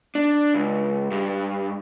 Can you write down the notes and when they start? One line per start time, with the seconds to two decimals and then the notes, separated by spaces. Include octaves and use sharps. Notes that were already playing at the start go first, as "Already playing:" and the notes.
0.15 D4
0.55 C#2
1.11 G2